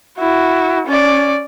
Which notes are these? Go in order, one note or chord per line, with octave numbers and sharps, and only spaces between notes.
E4 F#4
C#4 D5